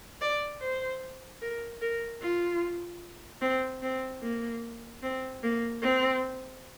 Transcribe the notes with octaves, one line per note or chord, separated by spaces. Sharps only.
D5
C5
A#4
A#4
F4
C4
C4
A#3
C4
A#3
C4